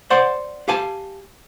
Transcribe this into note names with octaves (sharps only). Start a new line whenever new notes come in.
C5 D5 F#5 C6
G4 F5 G#5 A5